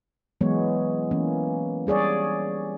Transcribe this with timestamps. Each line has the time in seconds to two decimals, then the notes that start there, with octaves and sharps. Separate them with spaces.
0.41 E3 F#3 G#3 B3 C#5
1.11 E3 A#3 C#4
1.87 G3 G#4 C#5 D5